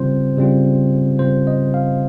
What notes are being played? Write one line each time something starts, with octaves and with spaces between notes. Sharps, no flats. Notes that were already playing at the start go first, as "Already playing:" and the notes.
Already playing: C#3 G3 C4 F4 C5
C#3 G3 C4 F4
C#3 G3 C4 F4 C5
D#5
F5